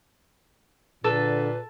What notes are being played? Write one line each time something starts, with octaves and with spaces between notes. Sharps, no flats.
A#2 D3 A4 B4